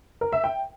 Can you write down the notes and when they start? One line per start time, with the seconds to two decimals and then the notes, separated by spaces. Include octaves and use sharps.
0.21 A#4
0.32 E5
0.44 G5